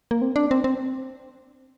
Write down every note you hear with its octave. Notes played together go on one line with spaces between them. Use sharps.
A#3
C4
D4
C4
C4